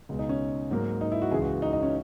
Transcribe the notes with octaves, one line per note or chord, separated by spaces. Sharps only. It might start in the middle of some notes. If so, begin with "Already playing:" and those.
C#2 B2 G#3
D#4
C#4
G#2 F#3 A#3
D#4
E4
F#4
C#2 C#3 E3 G#3 G#4
F#4
D#4
D#4
C#4